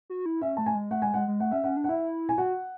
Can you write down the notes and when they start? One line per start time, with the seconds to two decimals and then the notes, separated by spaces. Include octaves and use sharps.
0.10 F#4
0.26 E4
0.41 C#4 E5
0.57 A3 A5
0.66 G#5
0.75 G#3
0.91 A3 F#5
1.02 G#3 G#5
1.14 G#3 F#5
1.28 G#3
1.40 A3 F#5
1.51 C#4 E5
1.64 C#4 F#5
1.77 D4
1.84 F#5
1.89 E4 E5
2.29 G#5
2.38 F#4 F#5